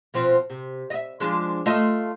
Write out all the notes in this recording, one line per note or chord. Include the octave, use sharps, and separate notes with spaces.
B2 F3 C4
C3
D#5 E5
F3 G#3 D4
A3 F4 D#5